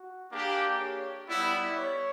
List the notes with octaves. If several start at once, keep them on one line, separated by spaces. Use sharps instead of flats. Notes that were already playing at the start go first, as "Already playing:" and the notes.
Already playing: F#4
A#3 D4 G4 G#4
C#5
G3 B3 E4 D5
C#5